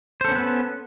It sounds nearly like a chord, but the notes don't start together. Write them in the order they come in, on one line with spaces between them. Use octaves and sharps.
C5 A4 C#4 B3 B4